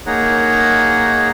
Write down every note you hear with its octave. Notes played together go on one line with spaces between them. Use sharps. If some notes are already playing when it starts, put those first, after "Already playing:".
A#3 D#4 G#4 C#5 F#5 A#5